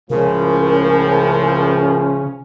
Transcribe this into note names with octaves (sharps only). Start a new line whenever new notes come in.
C#2 A2 C#3 F3 C#4 A#4